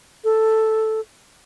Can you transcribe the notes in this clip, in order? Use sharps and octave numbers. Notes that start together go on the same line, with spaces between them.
A4